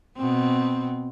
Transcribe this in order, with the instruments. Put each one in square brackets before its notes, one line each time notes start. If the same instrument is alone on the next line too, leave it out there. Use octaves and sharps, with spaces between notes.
[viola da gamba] B2 C4